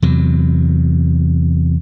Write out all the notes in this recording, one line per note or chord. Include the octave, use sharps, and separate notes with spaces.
E2 C3 F#3